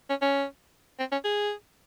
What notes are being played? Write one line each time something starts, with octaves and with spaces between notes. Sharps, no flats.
C#4
C#4
C4
C#4
G#4